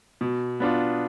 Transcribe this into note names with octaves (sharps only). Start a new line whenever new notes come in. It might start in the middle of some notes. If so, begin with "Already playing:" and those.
B2
B3 D4 F4